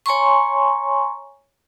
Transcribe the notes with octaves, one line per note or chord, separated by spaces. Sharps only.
C#5 G#5 A#5 C6 C#6